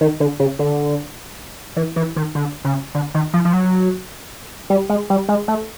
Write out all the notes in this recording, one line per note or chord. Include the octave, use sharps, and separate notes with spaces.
D#3
D3
C#3
D3
E3
E3
D#3
D3
C#3
D3
D#3
F3
F3
F#3
G3
G#3
G3
G#3
A3